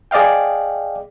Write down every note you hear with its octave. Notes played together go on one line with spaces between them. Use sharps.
G#4 D5 D#5 F5 G5